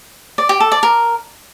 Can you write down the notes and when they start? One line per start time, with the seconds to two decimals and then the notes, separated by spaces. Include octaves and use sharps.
0.38 D5
0.49 G4
0.60 A4
0.72 D5
0.83 A#4